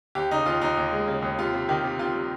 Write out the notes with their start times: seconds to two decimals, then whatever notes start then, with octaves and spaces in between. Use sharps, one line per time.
0.15 D#2 G4
0.31 C#3 D#4
0.46 D#2 F4
0.61 D#2 D#4
0.77 D#2
0.92 G#3
1.08 C#3
1.22 D#2
1.39 C3 F4
1.53 C3
1.69 D#3 G4
1.84 C3
1.99 C3 F4
2.15 G3